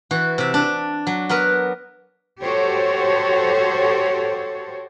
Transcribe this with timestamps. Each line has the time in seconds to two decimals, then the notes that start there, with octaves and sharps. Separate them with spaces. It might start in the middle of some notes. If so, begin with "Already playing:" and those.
0.11 E3 F#4
0.38 C3 E5
0.54 D4
1.07 F#3
1.29 B3 F#4 A#4 B4
2.42 F#4 G4 A4 C5 C#5